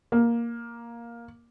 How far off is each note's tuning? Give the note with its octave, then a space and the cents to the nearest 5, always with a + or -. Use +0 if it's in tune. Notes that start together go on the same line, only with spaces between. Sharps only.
A#3 +5